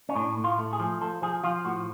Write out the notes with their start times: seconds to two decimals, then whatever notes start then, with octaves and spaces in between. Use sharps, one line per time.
0.09 C#4
0.16 A2 D4
0.38 A2
0.44 F4
0.58 A3
0.73 G#4
0.80 F3
1.01 F3 A4
1.22 F3 G#4
1.44 F3 F4
1.65 A2 F#4